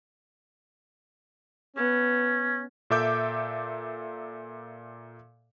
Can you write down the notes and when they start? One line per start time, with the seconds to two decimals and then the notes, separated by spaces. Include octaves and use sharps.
1.76 B3 C#4
2.90 A#2 A4 E5 D6 G6